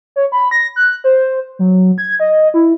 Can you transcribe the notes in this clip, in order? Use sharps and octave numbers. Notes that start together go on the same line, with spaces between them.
C#5
B5
A#6
F#6
C5
F#3
G#6
D#5
E4